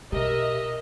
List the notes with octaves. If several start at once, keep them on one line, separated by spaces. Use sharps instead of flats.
B2 G4 A#4 D#5 E5